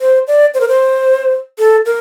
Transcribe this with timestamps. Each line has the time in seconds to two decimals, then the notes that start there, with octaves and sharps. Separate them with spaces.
0.01 C5
0.28 D5
0.54 C5
0.61 A#4
0.68 C5
1.58 A4
1.86 A#4